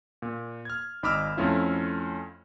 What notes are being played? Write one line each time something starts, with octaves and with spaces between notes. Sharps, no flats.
A#2
F6 G#6
G#1 D#4 B5 D6 E6 F6
F2 A3 C#4 E4 F4